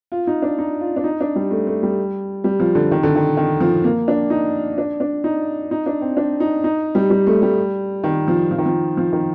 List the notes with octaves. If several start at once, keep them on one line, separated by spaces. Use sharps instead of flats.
F4
D#4
D4
D#4
F4
D4
D#4
D4
G3
A3
A3
G3
G3
F3
D3
D#3
D3
D#3
D#3
F3
A#3
D4
D#4
D4
D4
D#4
D#4
D4
C4
D4
D#4
D#4
G3
G3
A3
G3
D#3
F3
F3
D#3
F3
F3
D#3